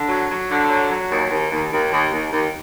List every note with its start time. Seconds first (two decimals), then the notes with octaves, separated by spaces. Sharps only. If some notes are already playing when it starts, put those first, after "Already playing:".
Already playing: D3
0.08 F#3
0.29 F#3
0.49 D3
0.69 F#3
0.90 F#3
1.09 D#2
1.30 D#2
1.51 D#2
1.71 D#2
1.91 D#2
2.11 D#2
2.31 D#2